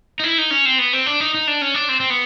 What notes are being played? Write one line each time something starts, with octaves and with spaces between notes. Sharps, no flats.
D#4
E4
D#4
C#4
C4
B3
C4
D4
D#4
D#4
D4
C#4
D4
C4
C4
B3